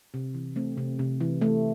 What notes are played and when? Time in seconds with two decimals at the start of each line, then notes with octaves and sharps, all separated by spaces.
0.14 C3
0.35 E3
0.56 A3 C4
0.77 C3
0.99 C3
1.21 E3
1.41 A3